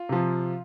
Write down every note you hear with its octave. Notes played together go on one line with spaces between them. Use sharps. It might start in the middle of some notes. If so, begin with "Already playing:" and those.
Already playing: F4
C3 F3